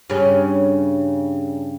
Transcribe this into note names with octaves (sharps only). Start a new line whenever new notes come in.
G2 C#3 C#4